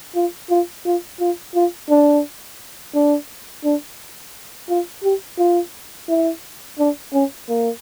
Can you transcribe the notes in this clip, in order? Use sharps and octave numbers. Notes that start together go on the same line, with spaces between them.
F4
F4
F4
F4
F4
D4
D4
D4
F4
G4
F4
E4
D4
C#4
A#3